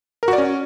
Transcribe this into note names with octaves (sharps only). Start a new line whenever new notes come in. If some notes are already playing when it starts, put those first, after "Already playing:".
A#4
F#4
D5
C#4